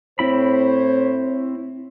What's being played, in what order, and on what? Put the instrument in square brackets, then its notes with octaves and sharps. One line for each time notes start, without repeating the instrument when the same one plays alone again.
[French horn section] A2 C5 C#5 [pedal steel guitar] C4 E4 B5